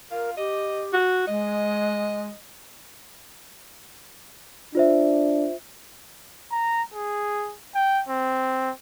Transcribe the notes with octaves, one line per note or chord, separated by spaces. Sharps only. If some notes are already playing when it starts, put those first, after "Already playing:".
F4 A#4
G4 D#5
F#4
G#3 D#5
D4 F4 C5 E5
A#5
G#4
G5
C4